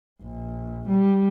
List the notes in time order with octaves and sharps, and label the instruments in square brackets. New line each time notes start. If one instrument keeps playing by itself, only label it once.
[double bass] A#1
G3